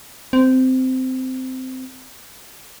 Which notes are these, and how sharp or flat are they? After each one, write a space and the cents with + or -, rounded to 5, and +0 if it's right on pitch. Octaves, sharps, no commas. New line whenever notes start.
C4 -15